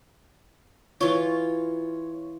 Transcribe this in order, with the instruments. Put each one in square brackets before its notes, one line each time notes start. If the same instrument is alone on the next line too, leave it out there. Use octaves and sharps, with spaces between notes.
[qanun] E3 F4 [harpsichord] C#5